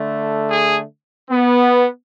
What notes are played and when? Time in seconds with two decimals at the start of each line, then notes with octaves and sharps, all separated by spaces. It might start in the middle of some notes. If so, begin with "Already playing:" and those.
Already playing: D3 A3
0.49 G#4
1.30 B3